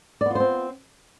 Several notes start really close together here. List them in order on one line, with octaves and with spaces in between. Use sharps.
D5 B3 F4 C5 C4